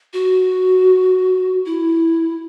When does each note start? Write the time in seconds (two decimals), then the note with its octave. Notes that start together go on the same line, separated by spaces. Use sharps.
0.13 F#4
1.66 E4